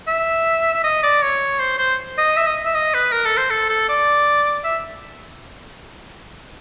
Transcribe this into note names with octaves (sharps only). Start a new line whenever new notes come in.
E5
E5
D#5
D5
C#5
C5
C5
D#5
E5
D#5
E5
D#5
B4
A#4
A4
C5
A4
A4
D5
E5